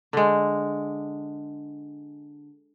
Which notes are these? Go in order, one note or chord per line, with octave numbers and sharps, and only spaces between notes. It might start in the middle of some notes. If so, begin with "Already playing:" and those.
D3 G#3